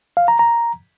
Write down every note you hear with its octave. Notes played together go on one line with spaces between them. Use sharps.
F5
A#5
A#5